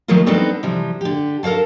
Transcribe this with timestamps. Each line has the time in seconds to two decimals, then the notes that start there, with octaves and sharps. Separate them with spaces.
0.08 D#3 F3 F#3 A3 A#3 F4
0.26 G3 B3 C4 D4 D#4 A4
0.63 C3 E3 F3 G3
1.01 D3 G4
1.43 A4 A#4 C#5 F5 A5